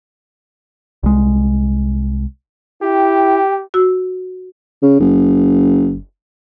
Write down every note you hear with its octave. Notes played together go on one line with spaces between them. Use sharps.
C2 G#3
E4 G4 G5
F#4 E6
C#3
F#1